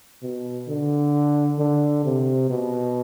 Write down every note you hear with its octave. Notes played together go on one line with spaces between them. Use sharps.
B2
D3
D3
C3
B2